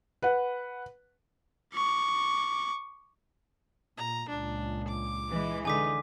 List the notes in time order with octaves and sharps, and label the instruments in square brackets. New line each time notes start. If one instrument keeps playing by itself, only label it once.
[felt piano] B4 F#5
[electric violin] C#6 D6
[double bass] A#2 [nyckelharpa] A#5
[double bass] C#2 A#2 [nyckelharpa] D4
[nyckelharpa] D6
[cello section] E3 G#3
[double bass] D3 [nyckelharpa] D#4 [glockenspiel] G#5 D6 B6